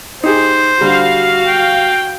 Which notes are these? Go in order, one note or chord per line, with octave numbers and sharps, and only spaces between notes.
D#4 G4 G#4 C5
D3 G3 F#4 F5
G5